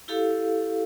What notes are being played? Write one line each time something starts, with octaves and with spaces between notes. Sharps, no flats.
E4 G4 A4 F5